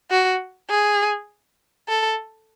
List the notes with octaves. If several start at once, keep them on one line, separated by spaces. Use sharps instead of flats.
F#4
G#4
A4